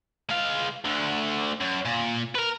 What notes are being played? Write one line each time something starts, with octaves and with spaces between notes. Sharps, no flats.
G#3 F5
D2 D3
F#2
A#2
A#4 B4